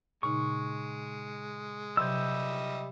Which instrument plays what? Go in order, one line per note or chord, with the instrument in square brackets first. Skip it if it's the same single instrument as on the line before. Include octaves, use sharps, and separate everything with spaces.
[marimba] A#2 C#3 D#4 [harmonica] G#3 [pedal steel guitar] C#6
[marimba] C3 F#3 C6 [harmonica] G3 D#5 E5 [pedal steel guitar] E6 G6